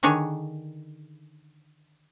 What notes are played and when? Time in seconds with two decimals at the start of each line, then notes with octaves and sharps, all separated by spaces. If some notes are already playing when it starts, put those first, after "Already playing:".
0.03 D3 D#3 D4 G#4 C#5